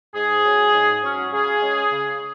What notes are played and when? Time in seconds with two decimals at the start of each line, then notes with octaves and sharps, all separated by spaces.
0.15 G#2 G#4
0.44 F#3 C#4
0.74 G#2
1.02 F#3 C#4
1.32 C#3 G#4
1.62 G#3 C#4
1.91 C#3